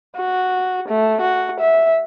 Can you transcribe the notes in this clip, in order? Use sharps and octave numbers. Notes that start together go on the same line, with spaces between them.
F#4
A3
F#4
E5